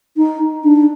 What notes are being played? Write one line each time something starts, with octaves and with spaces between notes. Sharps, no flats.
D#4
D4